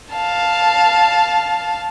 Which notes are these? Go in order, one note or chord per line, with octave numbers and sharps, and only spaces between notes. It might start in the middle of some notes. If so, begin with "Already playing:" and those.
F5 A5